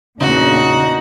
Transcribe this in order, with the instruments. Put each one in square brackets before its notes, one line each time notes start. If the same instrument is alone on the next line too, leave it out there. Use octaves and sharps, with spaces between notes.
[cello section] E2 A#2 D4 [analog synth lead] C#3 [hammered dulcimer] D#4 [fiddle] F#4